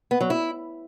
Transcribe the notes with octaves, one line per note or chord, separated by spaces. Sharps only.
B3
F#3
E4